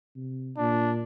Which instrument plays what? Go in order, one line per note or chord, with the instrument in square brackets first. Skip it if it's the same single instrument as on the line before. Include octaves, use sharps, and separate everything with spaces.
[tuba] C3
[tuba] A#2 [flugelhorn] D4